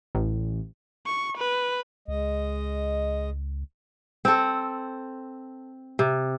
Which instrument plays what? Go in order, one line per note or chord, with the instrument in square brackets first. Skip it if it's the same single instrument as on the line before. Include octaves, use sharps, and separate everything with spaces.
[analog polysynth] A1
[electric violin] C#6
B4
[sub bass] C#2 [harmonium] G#3 D#5
[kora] C4 A4
C3